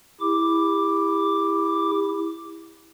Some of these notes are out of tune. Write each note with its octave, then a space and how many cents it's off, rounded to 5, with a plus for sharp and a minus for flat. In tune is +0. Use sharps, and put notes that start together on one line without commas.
E4 +0 G4 +40 D6 +0